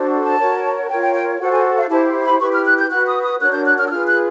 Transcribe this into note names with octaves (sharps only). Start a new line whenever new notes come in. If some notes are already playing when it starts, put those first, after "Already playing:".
Already playing: D4 F#4 A4 C5
A5
F#4 A#4 C#5
F4 A#4 C#5 G5
G5
G5
F#4 A4 C5 F#5
G#5
F5
E4 G4 C5 A5
B5
E4 G4 B4 C#6
F6
F#6
G6
F#4 B4 F#6
D#6
D#6
D4 F#4 A#4 C#5 F#6
G6
F#6
F6
E6
F4 G#4 B4 F6
F#6